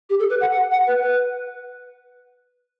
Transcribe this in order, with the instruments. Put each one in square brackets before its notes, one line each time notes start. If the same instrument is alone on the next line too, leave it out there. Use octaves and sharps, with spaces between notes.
[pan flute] G4
A4
B4
F#5
F#5
F#5
B4
B4